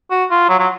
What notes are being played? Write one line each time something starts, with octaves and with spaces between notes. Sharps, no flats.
F#4
F4
F#3
F#3